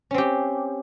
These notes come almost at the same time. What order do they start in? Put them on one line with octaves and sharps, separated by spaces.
C#4 C4 G4